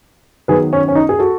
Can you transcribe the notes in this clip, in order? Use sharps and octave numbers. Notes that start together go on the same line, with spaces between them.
D#3 F#3 B3 G#4 B4
C#4
C#4
D#4
G#4
F#4 A4